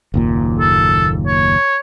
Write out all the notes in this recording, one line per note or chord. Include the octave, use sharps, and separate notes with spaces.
F#1 D#2 A#2
A4
C#5